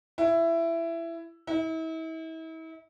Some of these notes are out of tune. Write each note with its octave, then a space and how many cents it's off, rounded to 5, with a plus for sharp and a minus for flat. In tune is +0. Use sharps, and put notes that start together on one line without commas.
E4 +15
E4 -40